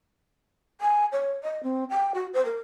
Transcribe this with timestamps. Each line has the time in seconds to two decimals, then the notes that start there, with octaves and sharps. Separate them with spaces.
0.81 G#5
1.12 C#5
1.44 D#5
1.63 C4
1.90 G5
2.14 F#4
2.34 C5
2.45 A#4